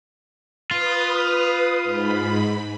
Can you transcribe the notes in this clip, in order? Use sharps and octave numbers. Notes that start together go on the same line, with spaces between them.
F4 B4 D#6
G#2 B5